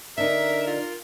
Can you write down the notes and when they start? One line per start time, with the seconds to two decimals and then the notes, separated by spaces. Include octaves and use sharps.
0.18 D3 D#4 A#4 D5 E5
0.67 F4